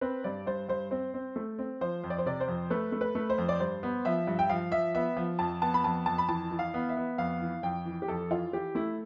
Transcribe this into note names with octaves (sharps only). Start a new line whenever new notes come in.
C4 B4
G2 D5
G2 C5
G2 C5
C4 C5
C4
A3
C4
F3 C5
F2
D5
C5
C3 D5
C5
F2
A3 B4
A3
B4
A3
C5
F2
D5
G2 C5
B3
F3 E5
G2
G5
F3 F5
F3 E5
B3 E5
F3
F2 A5
B3 A5
B5
F2 A5
F2 A5
B5
E3 A5
E3
F5
B3
E5
B3
F2 F5
E3
F2 G5
E3
G4
F2 A4
E3 F4
E3 G4
A3 E4